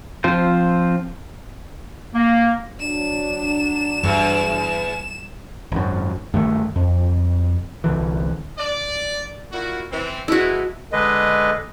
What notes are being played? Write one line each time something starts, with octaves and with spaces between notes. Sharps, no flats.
F3 C4 F4 C5
A#3
F#3 D4 E7
E2 G2
G#1 F#2
G2 D#3 A3
F2
C2 D3 E3
D5
A#2 E4 F#4
E3 C4
E3 G#3 A3 E4 F#4
D3 G#3 B4 D#5